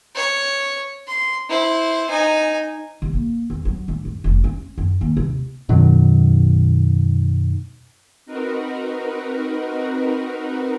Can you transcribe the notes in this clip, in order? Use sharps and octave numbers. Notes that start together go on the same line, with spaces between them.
C#5
C6
E4 C5
D#4 G#5
C3
A#3
E2
F#3
D1
F#2
F1
C#4
F#2
D#2
C3
F#2 B2 D#3 F#3
C4 D#4 F#4 A#4 B4